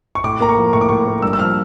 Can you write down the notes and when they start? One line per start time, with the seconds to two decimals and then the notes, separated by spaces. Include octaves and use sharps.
0.15 C#6
0.24 A2 D6
0.40 A#3 A#5
0.49 C#6
0.57 F3
0.73 A2 C#6
0.81 D6
0.89 A2 C#6
1.06 A#3
1.22 G2 E6
1.33 E6
1.39 F3 F6